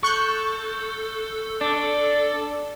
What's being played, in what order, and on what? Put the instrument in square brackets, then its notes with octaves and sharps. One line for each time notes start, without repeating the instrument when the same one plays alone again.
[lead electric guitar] A4 [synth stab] C#6 F#6 G6
[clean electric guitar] D4 [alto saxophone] D5